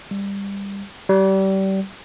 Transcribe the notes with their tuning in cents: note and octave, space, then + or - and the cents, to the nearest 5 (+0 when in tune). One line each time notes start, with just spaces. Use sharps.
G3 +20
G3 -30